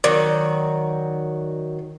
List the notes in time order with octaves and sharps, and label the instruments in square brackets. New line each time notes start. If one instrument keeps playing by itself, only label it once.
[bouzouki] D#3 F#3 [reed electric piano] D5